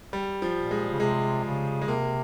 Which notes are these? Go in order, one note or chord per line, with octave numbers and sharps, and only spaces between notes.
G3
F3
A#2
G#3
C#3
C3 G#3
C#3
G#3
C3 A#3